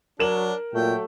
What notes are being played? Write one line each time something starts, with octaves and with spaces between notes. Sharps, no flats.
F#3 D4 A#4 E7 F#7
A#2 F#3 A3 G5